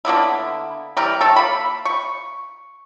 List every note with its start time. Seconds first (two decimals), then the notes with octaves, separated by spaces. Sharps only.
0.05 D3 A#3 B3 E4
0.97 E3 G3 A#4
1.21 D#3 A4
1.36 A#3 B5
1.85 C#6